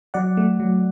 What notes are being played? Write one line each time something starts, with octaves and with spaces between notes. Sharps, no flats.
F#3 D5 F#5
A3
F#3